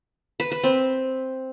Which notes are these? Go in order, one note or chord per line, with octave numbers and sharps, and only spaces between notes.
B4
B4
C4